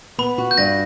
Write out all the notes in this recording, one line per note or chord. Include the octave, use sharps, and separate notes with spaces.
B3 B5
F#4
G6
G2 A#6